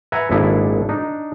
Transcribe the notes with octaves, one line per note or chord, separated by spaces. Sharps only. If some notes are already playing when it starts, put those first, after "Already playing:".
B4 E5 F#5 G#5 A#5
G#1 A#2 D4 E4 G#4 A4
D4 D#4